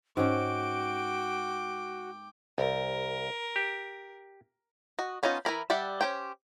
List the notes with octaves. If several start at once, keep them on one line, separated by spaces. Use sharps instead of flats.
G#2 C#4 F#4 G5 D6
C2 A#4
G4
F#4 D#5
B3 C#4 D#4 F4 D#5
E3 E4 A#4 B5
G3 D5 E5 F#5
C#4 G4 C5 G5